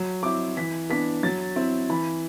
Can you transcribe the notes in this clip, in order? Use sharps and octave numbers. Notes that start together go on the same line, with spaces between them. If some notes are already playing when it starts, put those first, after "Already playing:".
Already playing: F#3
C4 E4 D6
E3 B6
B3 D4 B6
F#3 A6
C4 E4
E3 B5